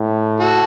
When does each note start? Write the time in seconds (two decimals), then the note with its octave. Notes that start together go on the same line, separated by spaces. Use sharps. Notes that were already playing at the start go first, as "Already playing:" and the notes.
Already playing: A2
0.40 F#4 A4